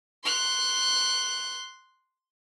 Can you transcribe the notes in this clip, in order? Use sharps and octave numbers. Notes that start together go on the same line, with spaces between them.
C6 F#6